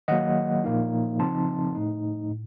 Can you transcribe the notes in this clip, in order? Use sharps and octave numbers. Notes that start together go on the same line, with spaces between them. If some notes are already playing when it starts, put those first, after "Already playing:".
D#3 F#3 A#3 D#5 F#5
A#2 F3 A#3 D#4
C#3 F3 C4 D#4 A5 C6
A2 A3 D#4
A2